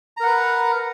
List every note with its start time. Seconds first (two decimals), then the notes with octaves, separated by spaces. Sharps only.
0.17 A#5
0.20 A#4
0.23 F#5
0.27 B4